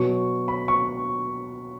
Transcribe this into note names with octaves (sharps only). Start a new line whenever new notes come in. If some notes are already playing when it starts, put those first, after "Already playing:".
Already playing: B2 F#3 C#6
B5
C#6